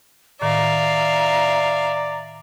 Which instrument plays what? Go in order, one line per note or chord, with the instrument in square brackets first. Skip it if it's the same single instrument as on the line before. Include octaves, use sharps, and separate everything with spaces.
[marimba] A2 D#3 [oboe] D5 [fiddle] E5 F5 [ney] A#5